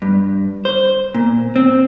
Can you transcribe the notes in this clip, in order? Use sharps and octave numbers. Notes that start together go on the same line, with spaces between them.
G2
C5
A#2
C4